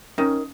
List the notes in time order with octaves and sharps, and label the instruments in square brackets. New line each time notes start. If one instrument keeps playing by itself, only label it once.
[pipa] D#3 [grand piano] C#4